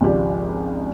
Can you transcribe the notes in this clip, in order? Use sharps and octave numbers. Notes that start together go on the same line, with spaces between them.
G#1 C#2 F3 G4 D5